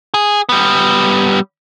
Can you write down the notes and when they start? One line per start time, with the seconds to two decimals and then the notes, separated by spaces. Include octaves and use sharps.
0.14 G#4
0.49 G3 B3